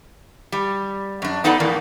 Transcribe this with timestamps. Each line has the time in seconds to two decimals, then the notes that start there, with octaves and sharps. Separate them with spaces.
0.52 G3
1.22 F#2 D4
1.44 B3 D#4 A4 B4 D5 F#5
1.60 F2 A2 E3 A#3